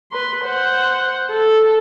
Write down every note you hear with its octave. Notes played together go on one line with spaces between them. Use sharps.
B4 C6
C5 F#5
A4